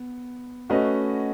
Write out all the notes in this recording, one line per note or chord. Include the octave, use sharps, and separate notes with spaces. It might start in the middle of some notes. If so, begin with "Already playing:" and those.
Already playing: B3
A3 C#4 F#4 B4 D#5